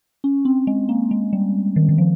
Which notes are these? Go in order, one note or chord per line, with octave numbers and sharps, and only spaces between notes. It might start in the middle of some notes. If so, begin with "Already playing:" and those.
C#4
C4
G#3
A#3
G#3
G3
D#3
D#3
F3